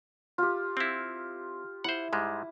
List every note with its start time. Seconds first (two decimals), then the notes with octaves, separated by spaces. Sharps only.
0.38 F4 G4
0.77 C4 E4
1.84 E4 C5 F#5
2.13 G#2 G3 G#3